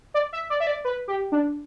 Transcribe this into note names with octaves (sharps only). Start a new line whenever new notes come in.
D5
E5
D5
E5
D5
B4
G4
D4